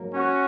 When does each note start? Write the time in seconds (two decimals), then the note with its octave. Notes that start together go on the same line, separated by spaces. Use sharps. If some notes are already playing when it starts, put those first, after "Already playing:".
Already playing: G#2 F#3 A#3
0.14 C#4 F#4